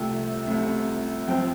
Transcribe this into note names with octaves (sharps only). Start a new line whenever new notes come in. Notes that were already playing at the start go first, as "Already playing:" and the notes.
Already playing: C2 C3 F3 A3 G5
C2 C3 F3 A3
F2 F3 C4 G5